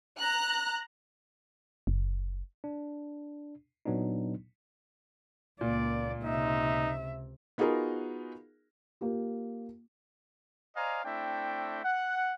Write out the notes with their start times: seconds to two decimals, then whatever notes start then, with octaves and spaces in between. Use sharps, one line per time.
0.19 A#5 F#6
1.87 F#1
2.64 D4
3.86 A#2 F#3 B3 D4 D#4
5.61 C#2 A#2 A#3 D5
6.23 C#2 C3 D#4 E5
7.58 B3 D#4 F4 F#4 G#4 A#4
9.01 A#3 F4 G4
10.76 C5 D5 D#5 F5 G#5 A#5
11.05 A3 C4 D4 E4 G5
11.84 F#5